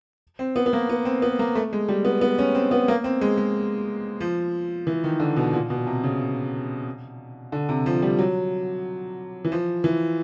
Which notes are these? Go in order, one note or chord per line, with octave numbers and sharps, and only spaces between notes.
C4
B3
B3
A#3
B3
C4
B3
A#3
A3
G#3
G3
B3
B3
C#4
C4
B3
A#3
C4
G#3
G#3
F3
E3
D#3
D3
B2
A#2
B2
C3
C#3
D3
C3
F3
G3
F#3
E3
F3
E3